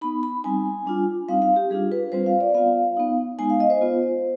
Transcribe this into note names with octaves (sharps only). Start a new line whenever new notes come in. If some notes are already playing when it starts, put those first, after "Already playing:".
B3 D#4 B5
B5
G3 C4 D#4 G#5
G3 D4 F4
G3 C4 D#4 F5
F5
G4
G3 D4 F4 G#4
B4
G3 C4 F4 C5
F5
D5
B3 F4 F5
B3 D#4
G#3 B3 D#4 G#5
F5
D#5
C5
B3 F4